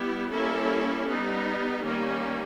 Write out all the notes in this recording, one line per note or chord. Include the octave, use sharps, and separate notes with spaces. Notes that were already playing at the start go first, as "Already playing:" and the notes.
Already playing: G3 B3 E4 G4
G3 A#3 C#4 E4 A4
G3 B3 D#4
D#3 G3 A#3 C#4